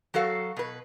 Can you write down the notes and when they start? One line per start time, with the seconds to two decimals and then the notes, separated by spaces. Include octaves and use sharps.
0.14 F#3 F#4 A4 F5
0.57 B2 B4